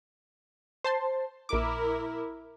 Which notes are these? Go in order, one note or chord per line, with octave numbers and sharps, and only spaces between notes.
C5 A5 C6
A#1 E4 A#4 D6